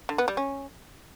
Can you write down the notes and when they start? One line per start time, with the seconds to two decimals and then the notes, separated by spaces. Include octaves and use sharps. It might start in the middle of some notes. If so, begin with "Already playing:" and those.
0.09 D3
0.18 B3
0.28 G3
0.37 C#4